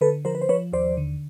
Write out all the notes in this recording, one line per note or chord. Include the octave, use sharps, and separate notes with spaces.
D3 A4 B4
F3 A#4 C5
B4
C5
F3 B4 C#5
D#2 C5 D5
D3